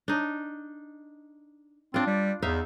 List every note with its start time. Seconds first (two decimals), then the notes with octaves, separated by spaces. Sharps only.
0.08 D4 D#4
1.94 C4 D4 F4
2.06 G3
2.42 E2 D#4 E5 F5